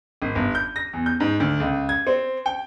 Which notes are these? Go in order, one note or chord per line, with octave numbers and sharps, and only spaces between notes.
G#1
G1
G6
A#6
E2
G6
G#2
D2
C#2
G#6
C4
G5